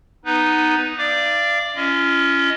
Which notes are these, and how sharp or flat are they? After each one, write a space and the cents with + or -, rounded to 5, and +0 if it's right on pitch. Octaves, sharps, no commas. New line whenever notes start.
B3 +0 D#4 +0 B4 +0
D5 +0 F5 -30 D6 +10
C#4 +10 F4 -45 D#5 +0